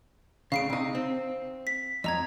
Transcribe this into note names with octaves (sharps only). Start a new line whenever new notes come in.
D2 C#3 F5 C7 D7
C3 D#4
C4
B6
F2 D#5 A#5 G#6